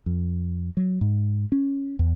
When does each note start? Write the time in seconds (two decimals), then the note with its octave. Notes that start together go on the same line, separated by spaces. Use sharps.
0.06 F2
0.77 F#3
1.01 G#2
1.52 C#4
1.99 E2